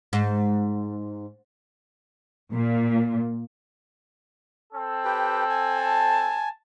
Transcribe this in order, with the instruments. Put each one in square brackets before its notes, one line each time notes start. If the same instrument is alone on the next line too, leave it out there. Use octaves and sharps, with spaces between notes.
[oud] G#2
[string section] A#2
[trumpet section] C4 A4
[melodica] G4 B4 G5
G#5
[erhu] A5